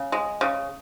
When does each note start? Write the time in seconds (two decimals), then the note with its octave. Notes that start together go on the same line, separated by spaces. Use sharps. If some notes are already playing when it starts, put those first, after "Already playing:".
Already playing: C#3
0.12 G#3
0.41 C#3